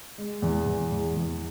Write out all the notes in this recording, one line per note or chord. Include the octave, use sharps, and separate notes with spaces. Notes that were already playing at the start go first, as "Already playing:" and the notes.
G#3
E2
E2
E2
E2